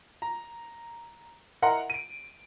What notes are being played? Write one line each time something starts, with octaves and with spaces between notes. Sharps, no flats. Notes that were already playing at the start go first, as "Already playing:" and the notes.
A#5
E4 A#4 D#5 F#5 A#5 C6
D7 D#7